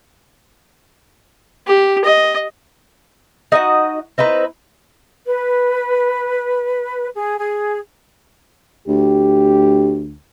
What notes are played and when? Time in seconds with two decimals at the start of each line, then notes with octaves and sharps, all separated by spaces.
1.67 G4
2.05 D#5
3.52 D#4 F#4 D#5 F#5
4.18 C4 D#4 E4 B4
5.26 B4
7.16 G#4
7.38 G#4
8.88 D2 G4